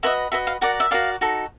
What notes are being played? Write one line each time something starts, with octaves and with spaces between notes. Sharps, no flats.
F#4 B4 D#5 E5
F#4 B4 D#5 E5
F5
F#4 A#4 D5 F#5
E5
F#4 A#4 D5 F5
D#4 F#4 A4